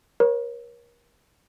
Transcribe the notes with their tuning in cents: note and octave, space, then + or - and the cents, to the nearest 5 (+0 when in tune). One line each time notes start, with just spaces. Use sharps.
A#4 +35 C#5 -25